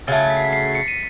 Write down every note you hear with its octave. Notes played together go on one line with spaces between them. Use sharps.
C#3 F#3 A3 A6
B6
C7
B6
C7
C#7
D#7